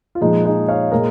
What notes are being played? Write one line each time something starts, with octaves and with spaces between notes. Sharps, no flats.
F4
A#2 F3 G#3 D#4 G#4
D#4 G#4
C#5 F5
A#2 G#3 A#4 D#5